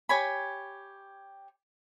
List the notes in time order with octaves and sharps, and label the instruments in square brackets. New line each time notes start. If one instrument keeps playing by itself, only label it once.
[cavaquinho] G4 C#5 G#5 B5